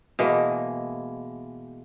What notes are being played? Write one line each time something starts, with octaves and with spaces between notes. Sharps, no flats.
B2 E3 G#3 A#3